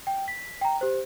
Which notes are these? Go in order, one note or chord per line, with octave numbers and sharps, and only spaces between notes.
G5
B6
G5 A#5
G4 C5